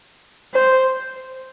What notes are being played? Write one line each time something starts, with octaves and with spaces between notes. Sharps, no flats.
C5